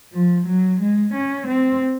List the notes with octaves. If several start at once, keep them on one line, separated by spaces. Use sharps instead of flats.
F3
F#3
G#3
C#4
C4